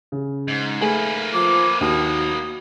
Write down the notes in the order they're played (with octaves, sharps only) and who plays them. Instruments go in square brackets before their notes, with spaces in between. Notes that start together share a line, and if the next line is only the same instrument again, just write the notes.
[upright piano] C#3
[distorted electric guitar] G#2
[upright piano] A3 G#4 F#7 [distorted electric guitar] A#3 B4
[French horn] F3 [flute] D6
[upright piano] D#2 [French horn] F#4 [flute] D#6